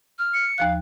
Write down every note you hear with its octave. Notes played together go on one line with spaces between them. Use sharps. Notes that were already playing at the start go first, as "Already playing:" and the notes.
F6
C#7
D#2 F3 F5 F#6